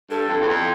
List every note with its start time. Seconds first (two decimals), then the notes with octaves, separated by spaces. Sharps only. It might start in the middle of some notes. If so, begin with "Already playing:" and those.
0.10 G2 A4
0.29 F2
0.41 E2
0.49 F2